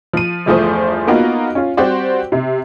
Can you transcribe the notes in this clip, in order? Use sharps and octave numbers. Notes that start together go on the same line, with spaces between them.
F3 D#7
G1 E2 F3 A3 C5 D#6
A#3 B3 D#4 F4 F#4
C#4 F4
G3 C4 F#4 G4 C5 D5
C3